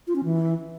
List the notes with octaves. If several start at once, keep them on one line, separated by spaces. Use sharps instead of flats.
F4
C#4
E3